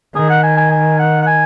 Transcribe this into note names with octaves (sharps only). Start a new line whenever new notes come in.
D#3 G#4
F#5
G#5
G#5
G#5
F#5
F#5
G#5